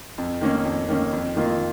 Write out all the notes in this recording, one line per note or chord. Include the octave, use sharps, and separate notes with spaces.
F2
D#3 A#3 C#4
F2
D#3 A#3 C#4
F2
D#3 A#3 F4